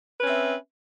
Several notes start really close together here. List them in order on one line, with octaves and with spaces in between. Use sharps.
B4 C#4 C4 E5